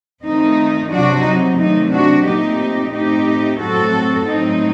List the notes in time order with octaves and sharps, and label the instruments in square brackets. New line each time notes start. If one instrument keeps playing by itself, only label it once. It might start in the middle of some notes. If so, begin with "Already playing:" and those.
[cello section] D#3 A3 C4 D#4
C3 F#3 C4 D4 F#4
D#4
C3 D#3 F#3 A3 C4 D#4
D4 F#4
A#2 A3 C4 D#4 G4
A2 A3 C4 D#4 G4
A2 F#3 C4 F#4 A4
A2 F#3 C4 D#4